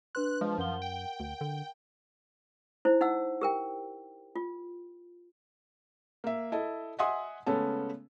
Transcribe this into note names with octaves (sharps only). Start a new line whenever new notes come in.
D4 B4 C6 F#6
F3 G#3
F#2 A#4 F#5 G7
G5
D2
D3
D#4 E4 C5
D#4 F#5 E6
G4 A#4 G5
F4
A#3 E5
E4 A4 D#5
D#5 E5 F#5 G#5 C6 D#6
C#3 G#3 A3 B3 C#4 A4